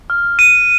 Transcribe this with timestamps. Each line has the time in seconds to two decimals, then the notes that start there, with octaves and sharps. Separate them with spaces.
0.10 F6
0.39 D#7